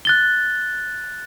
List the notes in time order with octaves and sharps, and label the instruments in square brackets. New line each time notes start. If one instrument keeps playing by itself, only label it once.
[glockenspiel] F#6 A6 G7